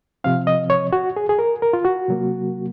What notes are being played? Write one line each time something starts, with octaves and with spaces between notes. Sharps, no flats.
C3 F3 C4 F5
D#5
C#5
F#4
G#4
G#4
A#4
A#4
F4
F#4
C3 F#3 A#3